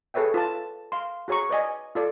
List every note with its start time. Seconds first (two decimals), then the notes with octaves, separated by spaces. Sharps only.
0.14 G#4 A4 B4 C#5 E5 G5
0.34 F4 B4 A5
0.92 F5 C6
1.28 F#4 G#4 C#5 A#5 C#6
1.49 B4 D5 D#5 G#5
1.95 F4 A4 D5